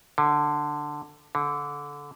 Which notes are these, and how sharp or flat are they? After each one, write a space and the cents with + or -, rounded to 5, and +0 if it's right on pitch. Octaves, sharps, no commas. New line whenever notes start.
D3 +10
D3 -20